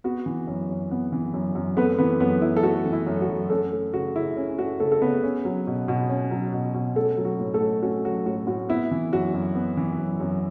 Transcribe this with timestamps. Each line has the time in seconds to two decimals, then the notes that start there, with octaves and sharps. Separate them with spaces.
0.04 B3 F#4
0.26 E3
0.47 F#2
0.69 F#2
0.91 B3
1.12 E3
1.34 F#2
1.55 F#2
1.77 A3 B3 B4
1.99 E3 B3 B4
2.20 F#2 B3 B4
2.42 F#2 E4
2.57 A4
2.63 A3 F#4
2.85 E3
2.93 E4
3.07 F#2
3.22 F#4
3.29 F#2
3.50 A3 C#4 A4
3.72 A3
3.93 C#3 F#4
4.15 C#3 E4
4.36 C#4
4.58 A3 F#4
4.80 C#3 A3 A4
4.92 A4
5.02 C#3 B3 B4
5.23 C#4
5.45 F#3
5.67 B2
5.88 B2
6.09 C#4
6.31 F#3
6.53 B2
6.74 B2
6.96 A3 C#4 A4
7.17 F#3
7.25 F#4
7.39 A2
7.54 A3 A4
7.61 A2
7.82 C#4 F#4
8.04 F#3 F#4
8.26 A2 F#4
8.47 A2 F#4
8.69 B3 E4
8.91 E3
9.12 F#2 F#4
9.34 F#2
9.55 B3
9.77 E3
9.98 F#2
10.20 F#2